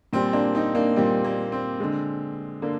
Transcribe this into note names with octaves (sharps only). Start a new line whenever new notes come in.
A#2 G3 C4
A#3 D4
C4 D#4
A#3 D4
A#2 G3 C4
A#3
C4
D3 G#3
D3 A#3 D4